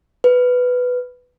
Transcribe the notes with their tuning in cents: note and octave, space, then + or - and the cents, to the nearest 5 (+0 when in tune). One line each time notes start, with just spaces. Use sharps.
B4 +5